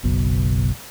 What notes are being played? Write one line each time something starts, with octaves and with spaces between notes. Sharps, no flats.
F#1 B1 B2